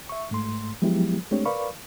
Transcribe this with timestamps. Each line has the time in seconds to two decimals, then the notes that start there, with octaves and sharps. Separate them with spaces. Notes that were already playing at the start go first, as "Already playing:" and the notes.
0.09 E5 C#6
0.31 G#2 A3 C6
0.82 F3 F#3 G#3 B3 E4 G4
1.31 G#3 A3 C4 D4 G4 C#5
1.45 A#4 B4 D5 F5 B5 C#6